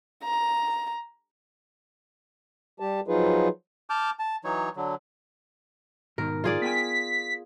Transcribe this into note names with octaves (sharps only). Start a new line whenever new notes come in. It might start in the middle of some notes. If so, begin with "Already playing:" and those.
A#5
G3 G4 A5
F3 F#3 D#4 F4 G#4 B4
A5 D6 F6 G6
A5
E3 F#3 D#4 C#5
D3 F#3
G#2 B2 D#3 A#4
F4 G#4 D5
B3 G5 G#5 B6